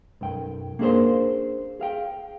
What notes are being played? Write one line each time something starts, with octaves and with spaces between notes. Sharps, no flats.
B1 F#2 G5
A#3 C#4 D4 G#4 A#4 C5
G#4 F5 G5